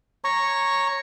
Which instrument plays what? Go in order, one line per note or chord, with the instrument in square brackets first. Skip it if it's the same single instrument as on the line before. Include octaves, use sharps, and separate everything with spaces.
[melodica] C#5 A#5 C#6